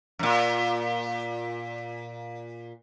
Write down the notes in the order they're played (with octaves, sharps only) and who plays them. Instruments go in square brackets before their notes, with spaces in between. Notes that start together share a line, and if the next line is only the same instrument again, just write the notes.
[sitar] F#2 A#2